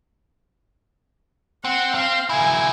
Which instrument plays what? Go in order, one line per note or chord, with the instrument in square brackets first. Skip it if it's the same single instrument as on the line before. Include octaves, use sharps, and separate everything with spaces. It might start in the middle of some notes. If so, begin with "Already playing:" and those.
[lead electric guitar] C4 [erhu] F#5
[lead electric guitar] C4 [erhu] F5
[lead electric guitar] A#3 E4 [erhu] G#5